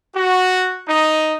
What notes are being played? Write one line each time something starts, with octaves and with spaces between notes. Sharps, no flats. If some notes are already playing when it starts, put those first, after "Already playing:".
F#4
D#4